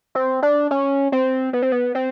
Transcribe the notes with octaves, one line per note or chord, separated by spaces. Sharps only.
C4
D4
C#4
C4
B3
C4
B3
C4